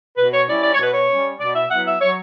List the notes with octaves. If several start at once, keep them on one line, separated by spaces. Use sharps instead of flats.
B2 B4
C#5
G3 C#4 E4 D5
D5
C#5
B2 B4
C#5
G3 C#4
B2 D5
E5
F#3 B3 E4 F#5
E5
F#3 C#5